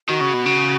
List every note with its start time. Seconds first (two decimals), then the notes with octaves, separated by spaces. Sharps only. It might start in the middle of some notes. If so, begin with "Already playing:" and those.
0.08 D#3 F#4
0.20 C#3
0.33 B2
0.46 C#3